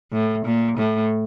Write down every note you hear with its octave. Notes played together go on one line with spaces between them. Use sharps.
A2
A#2
A2